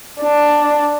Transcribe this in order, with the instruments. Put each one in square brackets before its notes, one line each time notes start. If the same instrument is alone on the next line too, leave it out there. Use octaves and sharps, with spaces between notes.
[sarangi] D4